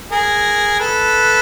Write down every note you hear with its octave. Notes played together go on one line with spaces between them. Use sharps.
G#4 A#4
A4 B4